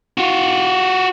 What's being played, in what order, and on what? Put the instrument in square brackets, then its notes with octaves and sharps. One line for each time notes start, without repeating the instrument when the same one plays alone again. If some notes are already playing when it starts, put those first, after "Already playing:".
[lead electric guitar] F4 F#4